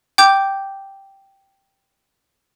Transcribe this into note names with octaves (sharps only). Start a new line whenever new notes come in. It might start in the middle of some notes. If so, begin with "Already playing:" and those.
G5 D6 G6